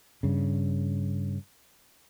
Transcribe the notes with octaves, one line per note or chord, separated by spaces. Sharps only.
G2 C#3